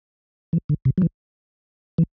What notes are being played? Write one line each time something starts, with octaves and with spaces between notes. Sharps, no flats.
E3
D3
C3
F#3
E3
E3